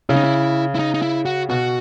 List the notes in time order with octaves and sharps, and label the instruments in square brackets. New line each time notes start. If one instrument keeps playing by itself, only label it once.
[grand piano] C#3 [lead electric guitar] E4
[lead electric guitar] D#4
E4
E4
D#4
D#4
E4
F#4
[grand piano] B2 [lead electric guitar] F#4